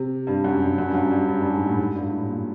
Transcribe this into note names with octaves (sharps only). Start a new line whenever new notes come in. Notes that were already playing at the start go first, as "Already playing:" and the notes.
Already playing: C3
G2
F#2
G2
F#2
G2
F#2
G2
G2
G2
G#2
A2
G#2
G2
A2
A#2